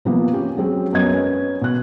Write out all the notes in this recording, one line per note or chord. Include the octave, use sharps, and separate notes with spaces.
C3 F3 A#3 B3
C#4 G4
F#3 G#3 C4 C#4
F#2 B3 D#5 G#6
C#4 B4
B2 F#6